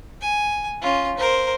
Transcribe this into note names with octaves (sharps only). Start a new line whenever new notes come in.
G#5
C#4 F4
A#4 C5